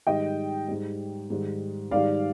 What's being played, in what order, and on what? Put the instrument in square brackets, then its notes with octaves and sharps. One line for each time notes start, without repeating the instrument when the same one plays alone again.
[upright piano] G#2 D#3 G3 D#5 G5
G#2 G3
G#2 D#3 G3
G#2 D#3 G3 D5 F5